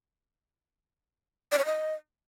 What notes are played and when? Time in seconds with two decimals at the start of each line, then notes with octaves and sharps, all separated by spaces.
1.52 D5
1.59 C#5
1.65 D#5